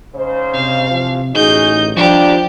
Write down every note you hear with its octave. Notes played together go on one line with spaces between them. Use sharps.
G#2 C#3 C5
C3 F5
E3 F3
A1 D#4 F#4 G#4 G6
D#3 F3 G3 D4 G4